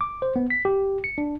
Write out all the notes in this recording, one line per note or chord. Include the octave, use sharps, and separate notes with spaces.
D6
C5
B3
B6
G4
C#7
D4